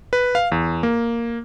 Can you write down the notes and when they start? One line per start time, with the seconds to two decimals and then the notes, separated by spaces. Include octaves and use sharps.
0.13 B4
0.35 F5
0.52 E2
0.83 A#3